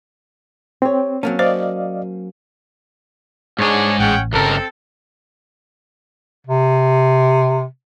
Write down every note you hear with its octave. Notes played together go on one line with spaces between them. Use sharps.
C4 G4 C#5
F#3 A#3 C#4 A5
C5 D5 D#5 F5
G#2 D4 G#4 C#5
A1 C#4 F#5 G5
G1 C#2 C#3 C4 A4 A#4
C3